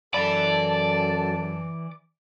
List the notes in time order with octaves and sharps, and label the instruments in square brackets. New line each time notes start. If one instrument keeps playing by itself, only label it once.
[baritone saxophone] F#2 [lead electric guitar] E3 B5 [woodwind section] A4 A5 [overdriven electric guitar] D5